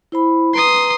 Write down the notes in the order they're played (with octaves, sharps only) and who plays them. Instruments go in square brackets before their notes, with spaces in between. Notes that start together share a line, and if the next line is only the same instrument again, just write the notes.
[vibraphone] E4 C5 B5
[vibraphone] B4 A#5 [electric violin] C6 D#6